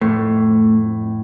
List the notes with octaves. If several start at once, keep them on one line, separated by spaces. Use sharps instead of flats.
F2 A2 A3